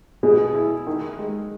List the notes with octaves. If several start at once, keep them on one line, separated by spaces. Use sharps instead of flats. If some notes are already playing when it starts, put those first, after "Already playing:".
B2 G#4
E4
D#3
G#3